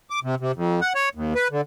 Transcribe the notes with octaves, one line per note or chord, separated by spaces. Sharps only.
D6
C3
C3
F2
F#5
C#5
D#2
B4
D3